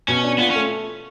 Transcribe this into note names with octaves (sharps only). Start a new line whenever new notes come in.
B2 C#4
D4
B3 F4
C#4
A3